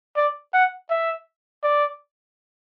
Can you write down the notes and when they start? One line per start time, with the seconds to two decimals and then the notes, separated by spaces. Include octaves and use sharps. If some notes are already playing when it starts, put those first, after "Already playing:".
0.16 D5
0.53 F#5
0.90 E5
1.63 D5